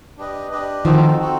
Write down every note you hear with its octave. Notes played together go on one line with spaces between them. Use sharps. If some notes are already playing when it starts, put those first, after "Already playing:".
D4 G4 B4 D#5
D4 G4 B4 D#5
D#3 F3 C4 D#4 F#4 A4
C4 D#4 F#4 A4